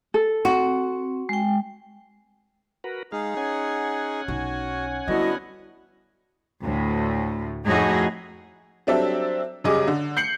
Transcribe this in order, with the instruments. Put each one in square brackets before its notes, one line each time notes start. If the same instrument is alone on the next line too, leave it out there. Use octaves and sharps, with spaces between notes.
[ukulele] A4
[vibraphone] C4 [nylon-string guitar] F#4
[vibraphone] G#3 G5
[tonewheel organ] F#4 A#4 B4
[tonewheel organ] G#3 F5 [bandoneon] D#4 G#4
[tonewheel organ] C#4 F#5 G#5
[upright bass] B1 D#4 [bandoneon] F#4
[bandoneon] D3 B3 [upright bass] G3 [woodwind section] E4 F#4 D#5
[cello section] D2 A2
F2 A2 D#4 F#4 G#4
[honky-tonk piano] F#3 G3 C4 D4 A4 E5
F#2 C#3 G3 G#4 D#5 D6
D3
G6 C7 C#7 F#7